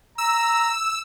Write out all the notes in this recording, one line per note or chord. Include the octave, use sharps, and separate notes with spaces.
A#5 E6